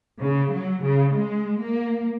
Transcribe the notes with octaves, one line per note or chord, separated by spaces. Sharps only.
C#3
F#3
C#3
G#3
A#3